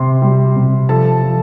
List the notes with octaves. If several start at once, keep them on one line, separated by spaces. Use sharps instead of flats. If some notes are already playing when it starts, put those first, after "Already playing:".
Already playing: C3 C6
G3
C3
F3 A4 A5
F3